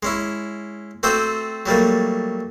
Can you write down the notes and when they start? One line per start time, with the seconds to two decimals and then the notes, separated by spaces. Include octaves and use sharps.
0.03 G#3 C#4 E4
1.03 A3 C4 F#4 A4 G5 D6
1.66 F#3 G3 A3 A#3